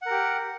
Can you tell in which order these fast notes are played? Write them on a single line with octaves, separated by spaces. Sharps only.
F#5 A#4 G4